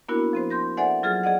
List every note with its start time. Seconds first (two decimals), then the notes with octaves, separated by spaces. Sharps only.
0.09 A#3 B3 D4 E4 F#4 A#4
0.33 F3 C4 C5
0.50 C6 G6 A#6
0.77 A4 C5 D5 E5 F#5 G#5
1.03 F#3 F4 G#4 F6 A6
1.23 G#4 D5 D#5 F#5